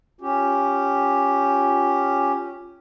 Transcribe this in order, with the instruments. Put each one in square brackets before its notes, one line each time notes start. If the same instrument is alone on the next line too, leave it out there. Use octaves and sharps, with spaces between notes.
[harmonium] C#4 G4 [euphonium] F4